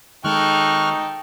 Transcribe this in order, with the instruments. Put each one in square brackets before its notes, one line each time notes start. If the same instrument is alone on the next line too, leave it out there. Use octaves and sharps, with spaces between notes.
[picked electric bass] D#3 G#3 [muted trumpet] D#4 [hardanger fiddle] A4 G5 [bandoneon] C#6 F6 F#6